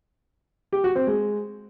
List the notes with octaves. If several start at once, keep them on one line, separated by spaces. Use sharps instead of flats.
G4
F#4
C4
G#3